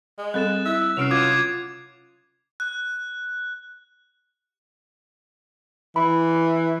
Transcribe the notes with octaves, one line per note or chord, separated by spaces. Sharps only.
G#3
G3 C4 A4 F#6 A6 E7
E4 E5
E6
C3 F#3 C#4 F6 C7 D7 F7
F4 D6 D#6 G#6 D#7
F#6
E3 B5